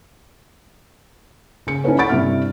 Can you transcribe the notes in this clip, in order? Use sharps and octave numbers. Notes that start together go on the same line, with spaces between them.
C#3 C#7
C#4 D#4 E4 A4 B4 C#5
F#5 B5 C#6 A6 D7
G2 C3 C4 E4 E5 F6